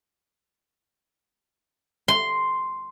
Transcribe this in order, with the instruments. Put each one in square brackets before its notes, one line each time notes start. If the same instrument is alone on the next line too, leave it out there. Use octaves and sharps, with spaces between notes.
[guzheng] C6